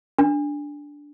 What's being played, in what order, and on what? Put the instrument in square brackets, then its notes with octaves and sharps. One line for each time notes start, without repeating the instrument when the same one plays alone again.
[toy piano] D4